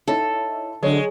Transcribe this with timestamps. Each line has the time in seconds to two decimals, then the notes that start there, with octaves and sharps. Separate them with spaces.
0.08 D#4 E4 A4 C#5
0.83 D3 F#3 G#3 C#5 D#5